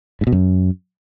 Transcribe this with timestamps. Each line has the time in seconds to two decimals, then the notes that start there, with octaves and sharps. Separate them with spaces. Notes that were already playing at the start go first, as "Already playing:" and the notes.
0.21 G#2
0.27 B2
0.32 F#2